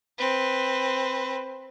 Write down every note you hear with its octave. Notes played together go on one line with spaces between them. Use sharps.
C4 B4